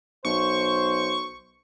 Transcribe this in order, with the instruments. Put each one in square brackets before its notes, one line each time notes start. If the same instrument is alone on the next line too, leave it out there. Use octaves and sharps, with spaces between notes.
[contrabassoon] B1 [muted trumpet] C5 [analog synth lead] C#6